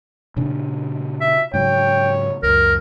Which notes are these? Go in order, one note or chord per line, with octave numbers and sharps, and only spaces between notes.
A#2 C#3 D4
E5
G#2 C#3 F#3 C#5 G5
C#2 F#2 A#4